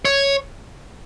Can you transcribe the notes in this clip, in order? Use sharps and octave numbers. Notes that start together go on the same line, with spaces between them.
C#5